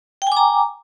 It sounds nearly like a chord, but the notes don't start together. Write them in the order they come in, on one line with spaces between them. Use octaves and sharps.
G5 G#5 D6 A#5